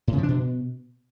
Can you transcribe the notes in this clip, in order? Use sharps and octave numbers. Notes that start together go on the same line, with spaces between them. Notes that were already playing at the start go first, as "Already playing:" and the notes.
A2
C#3
F3
D4
B2